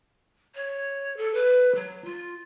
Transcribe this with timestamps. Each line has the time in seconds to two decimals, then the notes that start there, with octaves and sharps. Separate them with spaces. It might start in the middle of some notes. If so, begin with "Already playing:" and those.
0.55 C#5
1.17 A4
1.34 B4
1.75 F#3
2.05 F4